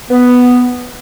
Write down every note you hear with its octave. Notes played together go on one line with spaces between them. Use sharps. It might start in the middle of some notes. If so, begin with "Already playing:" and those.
B3